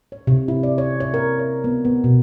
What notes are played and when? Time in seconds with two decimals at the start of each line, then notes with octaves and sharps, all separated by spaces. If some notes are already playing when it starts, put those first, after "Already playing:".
0.12 C#5
0.27 C3
0.48 E4
0.63 D5
0.78 C#5
1.00 C#5
1.14 A#4
1.39 C#5
1.64 B3
1.85 B3
2.04 B2